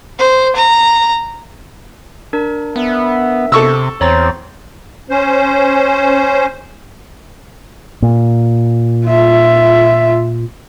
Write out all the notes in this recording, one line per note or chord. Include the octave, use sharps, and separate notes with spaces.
C5
A#5
D4 A#4
B3 E5
C3 A4 C#6 E6
E2 C4 C#5 A#5 A6
C#4 C5
A#2
F4 E5